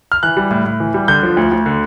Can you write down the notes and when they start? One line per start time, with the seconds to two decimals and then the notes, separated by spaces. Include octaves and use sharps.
0.12 F6
0.23 E3 F#6
0.37 G3
0.51 A2
0.65 A2
0.80 E3
0.94 G3
1.08 D3 G6
1.23 F3
1.37 D2
1.52 D2
1.66 D3